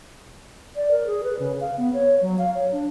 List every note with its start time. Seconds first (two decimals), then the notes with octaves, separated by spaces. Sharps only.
0.76 D5
0.91 A#4
1.06 G#4
1.24 B4
1.39 C#3
1.61 F5
1.77 B3
1.93 C#5
2.21 F#3
2.38 F5
2.54 C#5
2.72 D4